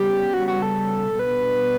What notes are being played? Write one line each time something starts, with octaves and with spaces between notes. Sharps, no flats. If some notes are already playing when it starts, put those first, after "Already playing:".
Already playing: C#3 G3 B3 G4
F#4
F#4
A4
B2 G3 B3 D4 B4